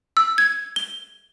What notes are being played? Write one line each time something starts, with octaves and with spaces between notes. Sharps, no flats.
E6
G#6
G7